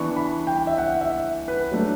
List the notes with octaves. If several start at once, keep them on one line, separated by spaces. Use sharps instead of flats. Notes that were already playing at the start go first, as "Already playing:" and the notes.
Already playing: E3 B3 D4 C#6
B5
G5
E5
F#5
E5
B4
F#3 A3 D4